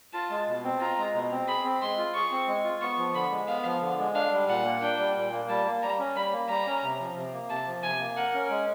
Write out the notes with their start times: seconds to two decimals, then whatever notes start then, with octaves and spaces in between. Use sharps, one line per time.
0.14 F4 A5
0.30 G#3
0.48 B2
0.64 C4
0.81 F4 A#5
0.98 G#3
1.14 B2
1.31 C4
1.47 G#4 B5
1.64 C4
1.82 G#3 C6
1.98 F4
2.15 G#4 C#6
2.31 C4
2.48 G#3
2.64 F4
2.82 B3 C#6
2.98 F3
3.15 D3 B5
3.31 G#3
3.48 B3 F5
3.65 F3
3.81 D3
3.99 G#3
4.15 D4 F5
4.32 G3
4.48 A#2 F#5
4.65 A#3
4.82 D4 G5
4.99 G3
5.16 A#2
5.32 A#3
5.49 G3 A5
5.66 A#3
5.82 G3 A#5
5.99 C#4
6.16 G3 B5
6.33 A#3
6.49 G3 A#5
6.66 C#4
6.83 C3
7.00 F3
7.16 C3
7.33 A#3
7.50 C3 A5
7.67 F3
7.83 C3 G#5
8.00 A#3
8.17 A#4 F#5
8.34 C#4
8.50 G#3